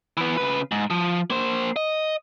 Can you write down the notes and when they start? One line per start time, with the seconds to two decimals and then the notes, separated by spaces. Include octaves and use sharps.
0.17 E3 B3
0.37 C#3 B4
0.72 G#2
0.90 F3
1.30 A#3 C5
1.76 D#5